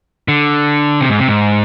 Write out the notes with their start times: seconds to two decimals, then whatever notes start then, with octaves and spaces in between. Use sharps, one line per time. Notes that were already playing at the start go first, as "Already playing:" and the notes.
0.28 D3
1.00 C3
1.10 G#2
1.19 C3
1.28 G#2